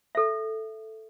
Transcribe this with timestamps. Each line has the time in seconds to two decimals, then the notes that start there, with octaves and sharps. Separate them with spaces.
0.15 A4 E5